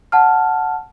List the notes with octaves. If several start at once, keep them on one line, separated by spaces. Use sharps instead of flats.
F#5 A5 F6